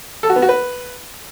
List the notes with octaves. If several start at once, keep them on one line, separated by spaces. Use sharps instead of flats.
A4
F#4
B3
F#4
B4